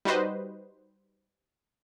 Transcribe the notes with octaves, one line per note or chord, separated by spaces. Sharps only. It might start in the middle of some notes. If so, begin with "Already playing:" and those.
G3 D#4 F#4 B4 C5 D#5